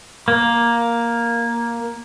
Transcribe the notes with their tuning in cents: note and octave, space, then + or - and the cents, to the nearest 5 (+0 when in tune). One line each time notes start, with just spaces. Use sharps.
A#3 +5